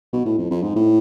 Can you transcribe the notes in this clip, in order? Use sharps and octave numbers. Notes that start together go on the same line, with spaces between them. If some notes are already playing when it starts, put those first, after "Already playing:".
B2
A2
F2
F2
G#2
A2